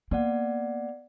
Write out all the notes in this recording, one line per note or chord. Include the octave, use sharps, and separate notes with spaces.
A#3 B3 D5 F#5